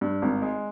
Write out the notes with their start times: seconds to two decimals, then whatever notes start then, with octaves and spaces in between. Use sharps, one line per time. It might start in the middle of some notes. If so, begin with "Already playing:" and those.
0.01 G2
0.22 G#1
0.42 G#3